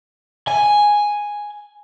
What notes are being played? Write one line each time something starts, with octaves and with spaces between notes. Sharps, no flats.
G#5